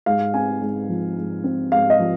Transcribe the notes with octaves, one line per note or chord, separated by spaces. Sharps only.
G#2 F5
C4 G#5
G#2
F3
G#2
C4
G#2 F5
D#5
F3